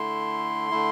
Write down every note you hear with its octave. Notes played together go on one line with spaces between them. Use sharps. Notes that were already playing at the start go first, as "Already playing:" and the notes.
Already playing: D3 A3 E4 C6
D3 A3 E4